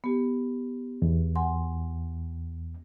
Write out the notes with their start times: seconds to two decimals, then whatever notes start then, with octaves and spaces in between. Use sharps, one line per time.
0.04 B3 G4
1.02 E2
1.36 F#5 G#5 C6